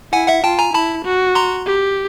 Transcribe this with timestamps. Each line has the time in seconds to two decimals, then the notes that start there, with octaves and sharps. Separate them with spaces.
0.13 E4 F#5 G#5
0.28 E5 F#5
0.44 F4 G5 A5
0.59 G#5 A#5
0.74 E4 A5 B5
1.05 F#4
1.35 A#5 C6
1.66 G4